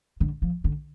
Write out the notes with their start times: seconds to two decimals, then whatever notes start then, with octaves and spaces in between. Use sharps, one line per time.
0.20 D3
0.42 F3
0.64 D3